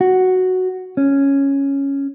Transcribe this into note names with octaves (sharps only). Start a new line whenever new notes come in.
F#4
C#4